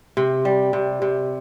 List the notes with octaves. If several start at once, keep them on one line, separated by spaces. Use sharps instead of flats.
C3
G3
C3
C3